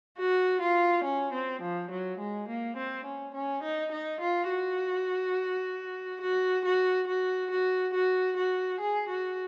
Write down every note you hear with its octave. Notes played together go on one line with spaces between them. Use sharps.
F#4
F4
C#4
C4
F3
F#3
G#3
A#3
C4
C#4
C#4
D#4
D#4
F4
F#4
F#4
F#4
F#4
F#4
F#4
F#4
G#4
F#4